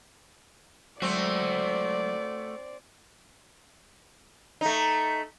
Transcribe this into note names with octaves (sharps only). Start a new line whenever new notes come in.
F#3 G#3 A3 C4 F#4 D5
A3 D#4